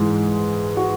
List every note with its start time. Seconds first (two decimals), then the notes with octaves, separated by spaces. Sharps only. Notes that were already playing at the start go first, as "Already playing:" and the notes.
Already playing: G#2 E3 G#3
0.77 F#4